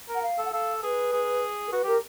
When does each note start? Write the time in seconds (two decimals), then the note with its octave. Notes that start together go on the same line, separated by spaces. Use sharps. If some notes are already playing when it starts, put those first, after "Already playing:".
0.09 A#4
0.15 F#5
0.23 F5
0.38 A4
0.45 F#5
0.52 A4 F5
0.83 G#4 B4
1.13 G#4
1.68 A#4
1.72 F#4 B4
1.84 G4 A#4